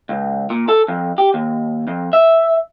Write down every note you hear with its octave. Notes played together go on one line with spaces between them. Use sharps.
C#2
A#2
A4
F2
G4
D#2
F2
E5